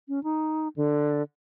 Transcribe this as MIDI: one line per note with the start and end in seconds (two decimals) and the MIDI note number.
0.08 0.22 61
0.24 0.68 63
0.76 1.22 50